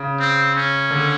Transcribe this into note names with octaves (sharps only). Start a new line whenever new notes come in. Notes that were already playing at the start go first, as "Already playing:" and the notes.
Already playing: C#3
C4
C#4
D3